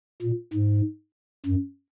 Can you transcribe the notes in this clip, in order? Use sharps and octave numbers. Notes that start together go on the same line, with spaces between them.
A#2
G#2
F#2